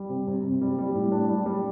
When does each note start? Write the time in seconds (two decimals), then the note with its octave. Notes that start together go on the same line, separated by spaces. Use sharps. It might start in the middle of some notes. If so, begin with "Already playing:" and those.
Already playing: G3
0.09 C3
0.27 C3
0.44 C3
0.61 G3
0.78 G3
0.94 A2
1.12 D4
1.29 G3
1.46 G3